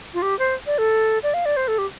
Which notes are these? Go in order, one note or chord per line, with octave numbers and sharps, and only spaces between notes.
F4
G4
C5
D5
A4
D5
F5
D5
C5
A4
G4